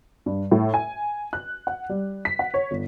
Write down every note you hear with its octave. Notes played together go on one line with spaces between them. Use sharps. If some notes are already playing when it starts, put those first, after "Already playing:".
G2
A2
G#5
F#6
F#5
G3
B6
F#5
C#5
G1